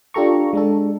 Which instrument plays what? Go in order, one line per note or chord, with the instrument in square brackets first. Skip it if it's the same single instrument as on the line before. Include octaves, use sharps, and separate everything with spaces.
[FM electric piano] D4 F4 G4 A4 A#5 C#6
G#3 D4 A4